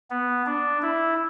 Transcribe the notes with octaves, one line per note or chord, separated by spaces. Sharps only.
B3
D4
E4